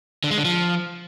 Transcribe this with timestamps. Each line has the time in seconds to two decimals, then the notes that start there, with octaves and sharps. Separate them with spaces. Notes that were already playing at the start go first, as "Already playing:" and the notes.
0.24 D3
0.31 G#3
0.38 D3
0.45 F3